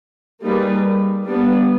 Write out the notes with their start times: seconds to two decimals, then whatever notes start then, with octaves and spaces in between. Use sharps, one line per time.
0.43 G3 A#3 D#4 G#4 B4
1.25 G3 B3 D4